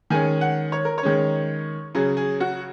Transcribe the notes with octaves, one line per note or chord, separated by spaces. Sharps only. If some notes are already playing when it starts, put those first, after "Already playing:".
D#3 G#3 C#4 G#5
F#5
C#5
A#4
C#5
D#3 G#3 C#4
C#3 F#3 C#4 G#4
G#4
F#4